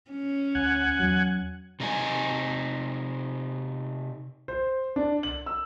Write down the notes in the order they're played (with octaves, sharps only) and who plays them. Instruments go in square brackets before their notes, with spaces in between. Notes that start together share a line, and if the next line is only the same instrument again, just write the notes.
[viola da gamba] C#4
[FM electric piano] D2 [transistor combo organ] F#5 G#5
[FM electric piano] E2 F#3
[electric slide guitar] C3 D#4 D5 G#5
[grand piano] C5
D4
F#7
E6